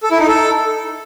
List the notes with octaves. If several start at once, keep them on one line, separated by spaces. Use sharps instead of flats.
A4
E4
D#4
A4